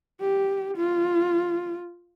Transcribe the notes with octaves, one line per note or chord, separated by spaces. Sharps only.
G4
F4